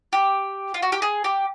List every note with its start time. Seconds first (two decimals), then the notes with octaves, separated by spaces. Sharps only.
0.13 G4
0.74 F4
0.83 F#4
0.92 G4
1.02 G#4
1.24 G4